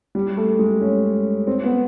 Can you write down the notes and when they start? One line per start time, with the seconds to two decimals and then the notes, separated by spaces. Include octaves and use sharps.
0.15 G3
0.37 A3
0.59 G#3
0.81 C#4
1.47 C4
1.64 B3